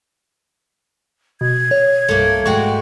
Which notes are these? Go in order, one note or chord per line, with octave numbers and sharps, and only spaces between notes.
B2 G#6
C#5
C2 G2 A3 A#3
G#2 G#3 A3 F#4 G5 C#6